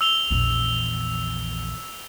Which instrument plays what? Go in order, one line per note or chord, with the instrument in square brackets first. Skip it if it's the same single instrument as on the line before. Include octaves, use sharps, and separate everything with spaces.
[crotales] E6 F7 G7
[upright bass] A#1 E2